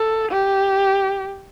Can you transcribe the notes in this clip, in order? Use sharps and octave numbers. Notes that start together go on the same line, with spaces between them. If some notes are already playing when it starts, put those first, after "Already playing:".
Already playing: A4
G4